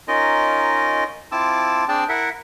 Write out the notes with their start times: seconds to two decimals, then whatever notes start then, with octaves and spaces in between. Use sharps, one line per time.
0.08 C#4 D#4 F4 A#4 D#5
1.32 C4 E4 F4 A5 D6 E6
1.88 C4 D4 G#4 D5 G5 A5
2.09 E4 A#4 E5 F#5